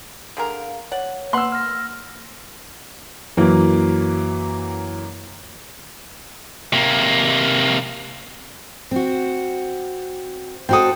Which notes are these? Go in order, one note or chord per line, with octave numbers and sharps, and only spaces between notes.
D3 G#4 A#4 F5
C#5 D5 F#5
A#3 B4 F#5 C6 E6
F6 A#6
F#2 E3 F#3 A#3
C3 A#3
C4 F#4
C4 F#4 A4 G5 D#6